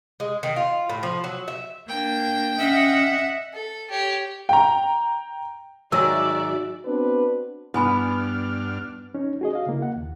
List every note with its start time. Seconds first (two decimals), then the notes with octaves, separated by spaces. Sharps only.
0.20 G#3
0.43 D#3
0.56 F4
0.89 A2
1.03 F3
1.24 F#3
1.48 E5
1.89 A#3 D4 G5
2.59 C#4 D#5 E5 F#5
3.53 A4
3.91 G4 C#5
4.49 G5 A#5
5.92 G#2 D#3 F#3 F#4 D5 E5 E6
6.85 B3 C4 D4 F#4 B4
7.74 G2 B3 D4 E4 G#5 B5 F6
9.15 C#4 D#4
9.41 F#4 G#4 D#5
9.53 D#5 F5
9.66 C#3 A#3 E4
9.82 F#5
9.96 D#2